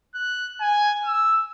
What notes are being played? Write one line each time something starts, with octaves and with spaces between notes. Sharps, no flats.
F#6
G#5
E6